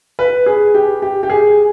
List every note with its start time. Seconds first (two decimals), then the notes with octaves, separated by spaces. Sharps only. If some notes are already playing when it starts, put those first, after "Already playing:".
0.19 B4
0.46 G#4
0.74 G4
1.02 G4
1.23 G4
1.30 G#4